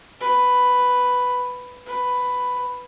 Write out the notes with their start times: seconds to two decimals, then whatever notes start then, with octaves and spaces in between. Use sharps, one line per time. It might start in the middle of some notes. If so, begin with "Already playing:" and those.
0.21 B4
1.87 B4